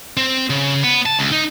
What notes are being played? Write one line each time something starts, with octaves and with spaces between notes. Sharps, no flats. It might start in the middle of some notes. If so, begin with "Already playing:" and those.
C4
C#3
B3
A5
C#2
D#4